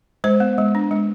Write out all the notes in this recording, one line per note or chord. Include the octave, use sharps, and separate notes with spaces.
G#3 C5
B3
G#3
D4
G#3